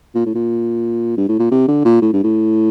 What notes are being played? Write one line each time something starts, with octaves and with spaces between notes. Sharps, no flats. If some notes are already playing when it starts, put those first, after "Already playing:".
A#2
A2
A#2
G2
A2
A#2
C3
D3
A#2
A2
G2
A2